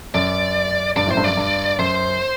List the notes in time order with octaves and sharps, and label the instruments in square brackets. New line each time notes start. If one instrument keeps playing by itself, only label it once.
[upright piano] F#2 [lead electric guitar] D5
[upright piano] G2 [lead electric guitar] D5
[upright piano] F#2 A2 [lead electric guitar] C5
[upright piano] G2
[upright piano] F#2 [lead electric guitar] D5
[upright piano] G2
[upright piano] F#2 [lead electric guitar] C5